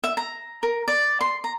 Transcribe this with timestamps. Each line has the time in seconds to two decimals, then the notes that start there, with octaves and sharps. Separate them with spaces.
0.04 E5
0.17 A#5
0.63 A#4
0.88 D5
1.21 C6
1.44 A#5